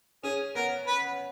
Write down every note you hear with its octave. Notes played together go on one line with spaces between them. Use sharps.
C#4 G#4
B3 A#4
B4